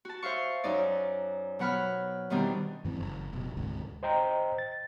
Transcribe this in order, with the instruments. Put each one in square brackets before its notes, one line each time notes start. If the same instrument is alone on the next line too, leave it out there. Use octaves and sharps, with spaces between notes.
[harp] F#4 A5
C5 E5 F5 C#6
F#2 D#4 D5
B2 F#3 F#5 B5 F6
E2 B2 D#3 G3 C4 D4
[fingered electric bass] F#2 E3 A#3 C4
F#1
F1 B2
D2 G#2 C3
[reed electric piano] C5 D#5 G5 A#5
A6